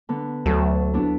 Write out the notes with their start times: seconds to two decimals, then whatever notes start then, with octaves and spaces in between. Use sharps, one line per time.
0.09 D3 B3
0.46 D2 F#3 A4
0.94 B3 D4 E4